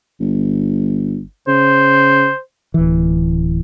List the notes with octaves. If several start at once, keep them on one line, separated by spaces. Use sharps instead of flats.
G1
C#3 C5
D1 E3